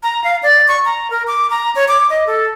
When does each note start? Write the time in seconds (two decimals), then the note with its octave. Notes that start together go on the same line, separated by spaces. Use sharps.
0.03 A#5
0.24 F5
0.43 D5
0.68 C#6
0.85 A#5
1.10 A#4
1.27 D6
1.50 A#5
1.75 C#5
1.88 D6
2.10 D#5
2.27 A4